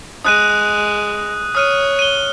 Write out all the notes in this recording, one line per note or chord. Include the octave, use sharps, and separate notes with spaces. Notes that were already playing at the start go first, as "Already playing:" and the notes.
G#3 D#6 F#6 D#7
C#5 D#6 F6 D#7
D#7 G7